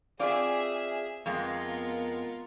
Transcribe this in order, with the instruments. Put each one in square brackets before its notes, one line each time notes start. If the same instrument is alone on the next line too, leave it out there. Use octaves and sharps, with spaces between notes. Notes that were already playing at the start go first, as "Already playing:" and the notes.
[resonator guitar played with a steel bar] C4 F4 D5 [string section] G#4 E5
[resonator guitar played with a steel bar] F2 G#3 [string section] B3 F4 A#4